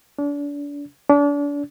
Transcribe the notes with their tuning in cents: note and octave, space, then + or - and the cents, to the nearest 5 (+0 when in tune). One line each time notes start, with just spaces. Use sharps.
D4 -35
D4 -35